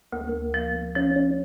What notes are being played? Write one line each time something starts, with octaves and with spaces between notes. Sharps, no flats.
D2 A#3
A#3
F3
F3 C#4
C#4